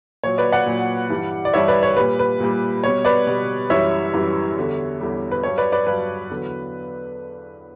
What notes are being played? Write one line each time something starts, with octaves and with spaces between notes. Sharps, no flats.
A#2 F#3 C#5
B4 D5
D5 F#5
A#2 F#3
G2 E3 G3
D5
G2 E3 G3 C#5 E5
B4 D5
C#5
A#2 G3 B4
B4
A#2 G3
B2 G3 C#5
B4 D5
B2 G3
F#2 E3 G3 C#5 E5
F#2 E3 G3
E2 D3 G3
E2 D3 G3
B4
G2 F#3 C#5
B4 D5
B4 D5
G2 F#3 B4
E2 D3 F#3